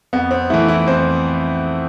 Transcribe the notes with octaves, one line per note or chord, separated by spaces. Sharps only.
F2 B3
C4
E3 A3 E4
E4
F2 C5